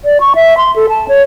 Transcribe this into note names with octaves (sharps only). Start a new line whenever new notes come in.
D5
C#6
E5
C6
A4
A5
C#5